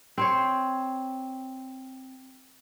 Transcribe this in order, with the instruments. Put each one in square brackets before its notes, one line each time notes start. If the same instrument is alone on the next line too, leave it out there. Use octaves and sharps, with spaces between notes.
[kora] C4 C5 C#5